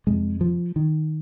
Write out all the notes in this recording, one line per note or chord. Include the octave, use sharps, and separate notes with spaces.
F2 C3 G#3
F3
D#3